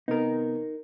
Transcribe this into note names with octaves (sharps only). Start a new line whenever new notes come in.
C3 B3 D#4 A#4